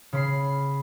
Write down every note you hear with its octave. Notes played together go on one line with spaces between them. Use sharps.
C#3 B5 C7